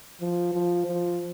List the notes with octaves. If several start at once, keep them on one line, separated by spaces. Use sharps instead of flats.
F3
F3
F3